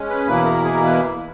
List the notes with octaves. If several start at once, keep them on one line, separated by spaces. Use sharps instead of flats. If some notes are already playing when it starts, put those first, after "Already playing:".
Already playing: G#3 C#4
B4
E2 B2 A#3 E4 B4
A#4
G#4
A#4
B4